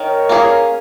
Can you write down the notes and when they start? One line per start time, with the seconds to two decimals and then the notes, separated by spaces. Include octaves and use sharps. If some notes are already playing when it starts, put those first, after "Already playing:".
Already playing: D#3 A#4 C#5
0.29 A#3 C#4 G#4